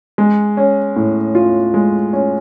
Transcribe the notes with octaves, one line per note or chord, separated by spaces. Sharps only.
G#3
C#4
A2
F4
G#3
C#4